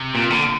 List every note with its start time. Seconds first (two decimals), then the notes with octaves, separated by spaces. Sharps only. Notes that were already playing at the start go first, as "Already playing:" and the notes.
Already playing: C3
0.15 A#2
0.30 D3